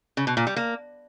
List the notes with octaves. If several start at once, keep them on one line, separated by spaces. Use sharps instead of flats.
C#3
B2
A#2
G3
A#3